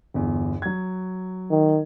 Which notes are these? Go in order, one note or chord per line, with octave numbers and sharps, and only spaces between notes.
G1 E2
F#3 G#6
D#3